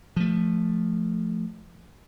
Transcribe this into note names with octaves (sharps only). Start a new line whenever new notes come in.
F3 A3